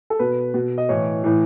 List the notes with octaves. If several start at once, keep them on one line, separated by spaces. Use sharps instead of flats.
A4
B2 B4
B2
D#5
A2 E3 C#5
A2 E3